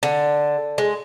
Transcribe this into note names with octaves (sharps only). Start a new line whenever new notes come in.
D3
G#3